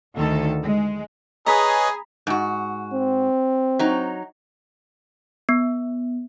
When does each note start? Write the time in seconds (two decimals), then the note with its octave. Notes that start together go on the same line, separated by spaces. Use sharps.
0.15 D2 D#3 A4
0.62 G#3
1.46 G#4 B4 C#5 D#5 A#5 B5
2.27 G#2 F#4
2.93 C4
3.79 F#3 D#4
5.49 B3